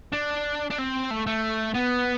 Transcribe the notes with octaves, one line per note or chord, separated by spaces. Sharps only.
D4
D4
C4
A3
A3
B3